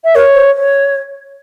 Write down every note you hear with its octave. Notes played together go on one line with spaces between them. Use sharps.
E5
A#4 C#5
C5
C#5